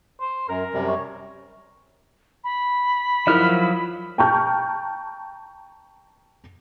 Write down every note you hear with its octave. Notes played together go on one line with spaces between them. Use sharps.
C5
F#2 A#4
F#2 C3 G3
C#5
B5
F3 F#3 D#4 E4 A#4 F6
G5 A5 A#5 C#6 F6 G6